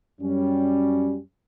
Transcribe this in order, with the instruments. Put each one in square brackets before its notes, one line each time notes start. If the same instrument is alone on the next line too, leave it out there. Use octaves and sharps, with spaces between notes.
[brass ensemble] F#2 G3 C#4